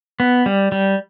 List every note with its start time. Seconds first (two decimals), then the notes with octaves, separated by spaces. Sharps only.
0.20 B3
0.46 G3
0.72 G3